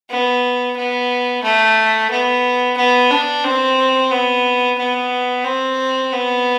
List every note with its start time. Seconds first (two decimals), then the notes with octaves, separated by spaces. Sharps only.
0.10 B3
0.77 B3
1.43 A3
2.11 B3
2.77 B3
3.11 D4
3.44 C4
4.11 B3
4.78 B3
5.44 C4
6.12 B3